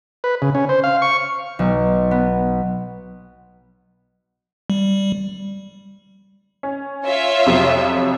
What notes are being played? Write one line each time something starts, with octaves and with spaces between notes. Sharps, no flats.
B4
C#3
C#4
C5
F5
C#6
B1
B3
G3
C#4
F4 C#5 E5
F2 C3 F#3